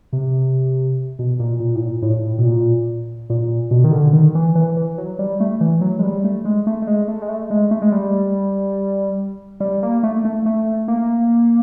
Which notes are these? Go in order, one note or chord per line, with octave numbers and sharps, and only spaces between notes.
C3
B2
A#2
A#2
A2
A#2
A2
B2
A#2
A#2
B2
D#3
D3
D#3
E3
E3
E3
F#3
G3
A3
E3
F#3
G#3
G3
A3
G#3
A3
A3
G#3
A3
G#3
A3
G#3
A3
G#3
G3
G3
A#3
A3
A3
A3
A#3